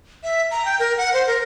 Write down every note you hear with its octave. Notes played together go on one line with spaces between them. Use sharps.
E5
A#5
G5
A#4
F#5
C5
A#4